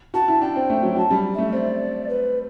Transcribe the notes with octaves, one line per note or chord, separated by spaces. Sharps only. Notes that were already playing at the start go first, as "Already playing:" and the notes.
F#4 A5
E4
D4 G5
C4
A3
F#3
F#3 A5
G3
A3 E5
C4 D5
B4